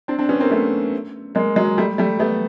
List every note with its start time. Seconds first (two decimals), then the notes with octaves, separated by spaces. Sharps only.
0.08 C4 D4
0.18 C4 D4
0.29 B3 C#4
0.40 A#3 C4
0.50 A3 B3
1.35 G#3 A#3
1.56 F#3 G#3
1.78 G3 A3
1.98 G3 A3
2.20 A3 B3